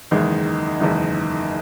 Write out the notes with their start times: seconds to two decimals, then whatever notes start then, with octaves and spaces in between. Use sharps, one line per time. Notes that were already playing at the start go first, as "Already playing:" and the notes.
0.11 F#1 E2 D#3 G#3
0.80 F#1 E2 D#3 G#3